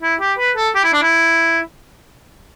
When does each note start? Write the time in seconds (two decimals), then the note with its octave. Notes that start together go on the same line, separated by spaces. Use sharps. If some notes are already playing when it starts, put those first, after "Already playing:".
0.02 E4
0.20 G4
0.38 B4
0.56 A4
0.75 G4
0.84 E4
0.93 D4
1.02 E4